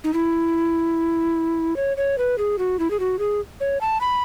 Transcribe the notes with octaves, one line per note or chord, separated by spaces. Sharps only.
D#4
E4
C#5
C#5
B4
G#4
F#4
E4
G#4
F#4
G#4
C#5
A5
B5